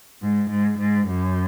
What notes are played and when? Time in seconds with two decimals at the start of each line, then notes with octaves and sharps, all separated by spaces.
0.21 G#2
0.50 G#2
0.78 G#2
1.07 F#2